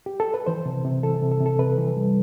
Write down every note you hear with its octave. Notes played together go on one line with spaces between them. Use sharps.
G4
A4
B4
E3 C5
C3
C3
E3 A4
C3
A4
C3
A4
C3 B4
E3
G3